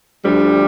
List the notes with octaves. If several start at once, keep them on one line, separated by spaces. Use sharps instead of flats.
D2 D3 F3 G3